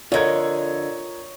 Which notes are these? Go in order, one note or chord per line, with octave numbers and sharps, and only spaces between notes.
F2 D3 F4 A#4 C#5 D#5 G#6